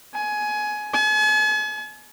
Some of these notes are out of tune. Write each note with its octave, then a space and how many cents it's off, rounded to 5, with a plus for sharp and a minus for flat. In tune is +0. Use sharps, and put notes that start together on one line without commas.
G#5 +20
G#5 +45